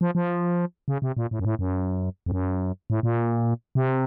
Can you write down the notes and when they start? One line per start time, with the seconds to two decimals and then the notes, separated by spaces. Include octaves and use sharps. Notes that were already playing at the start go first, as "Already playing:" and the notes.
0.01 F3
0.15 F3
0.88 C#3
1.02 C3
1.17 A#2
1.31 A2
1.39 F#2
1.45 A2
1.59 F#2
2.26 F2
2.32 F#2
2.90 A2
3.03 A#2
3.75 C3